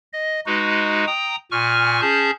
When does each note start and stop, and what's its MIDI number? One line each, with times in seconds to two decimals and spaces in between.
0.13 0.40 75
0.46 1.05 56
0.46 1.05 63
0.46 1.05 66
0.46 1.05 71
1.07 1.36 79
1.07 1.36 82
1.07 1.36 87
1.51 2.01 46
1.51 2.01 80
1.51 2.01 85
1.51 2.01 89
2.01 2.31 61
2.01 2.31 68
2.01 2.31 81
2.01 2.31 91